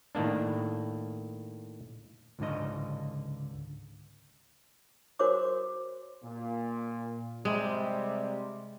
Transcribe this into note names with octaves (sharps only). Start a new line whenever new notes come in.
A2 D#3 A#3 D4
C#2 G#2 D3 D#5
F#4 A#4 C5 C#5 D6
A#2
C3 G3 G#3